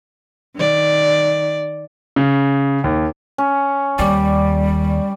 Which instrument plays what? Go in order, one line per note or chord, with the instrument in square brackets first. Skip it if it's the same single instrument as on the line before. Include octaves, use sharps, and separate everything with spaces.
[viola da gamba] D#3 D5
[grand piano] C#3
D#2
[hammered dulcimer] C#4
[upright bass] D#2 [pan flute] G3 [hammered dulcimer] G4 D5